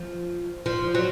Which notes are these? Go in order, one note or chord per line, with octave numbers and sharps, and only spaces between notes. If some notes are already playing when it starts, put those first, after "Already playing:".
Already playing: F3
F3
F#3